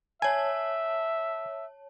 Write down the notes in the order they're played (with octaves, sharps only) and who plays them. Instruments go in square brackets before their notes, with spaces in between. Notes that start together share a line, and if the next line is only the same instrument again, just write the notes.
[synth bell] C#5 A5 [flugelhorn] E5 [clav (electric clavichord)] G#5